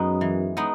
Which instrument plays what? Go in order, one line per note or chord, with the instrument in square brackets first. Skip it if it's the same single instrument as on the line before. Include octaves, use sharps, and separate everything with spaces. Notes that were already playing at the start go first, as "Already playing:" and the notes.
Already playing: [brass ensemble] F#2 [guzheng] G#3 B3 D#4
[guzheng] E3
G#3 B3 D#4